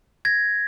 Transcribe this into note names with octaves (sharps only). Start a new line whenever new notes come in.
G#6 A#6